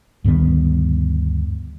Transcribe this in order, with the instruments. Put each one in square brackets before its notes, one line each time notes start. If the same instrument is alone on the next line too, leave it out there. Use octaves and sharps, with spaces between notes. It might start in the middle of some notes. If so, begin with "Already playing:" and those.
[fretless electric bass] D2 G2 D#3 B3